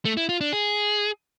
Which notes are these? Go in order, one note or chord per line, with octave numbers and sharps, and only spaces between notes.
A3
E4
F4
D4
G#4